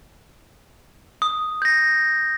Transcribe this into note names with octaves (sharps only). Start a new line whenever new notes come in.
D#6
G6 A#6